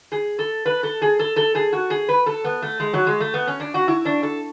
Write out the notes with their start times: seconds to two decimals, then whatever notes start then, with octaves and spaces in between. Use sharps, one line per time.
0.12 G#4
0.39 A4
0.66 B4
0.83 A4
1.02 G#4
1.19 A4
1.36 A4
1.55 G#4
1.73 F#4
1.90 G#4
2.08 B4
2.26 A4
2.44 B3
2.62 A3
2.80 G#3
2.93 F#3
3.07 G#3
3.20 A3
3.34 B3
3.47 C#4
3.60 D4
3.74 F#4
3.88 E4
4.05 D4
4.23 A4